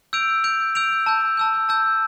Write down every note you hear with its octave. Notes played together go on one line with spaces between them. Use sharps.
E6 G6 D7 F7
E6 G6 D7 F7
E6 G6 D7 F7
A5 E6 G6
A5 E6 G6
A5 E6 G6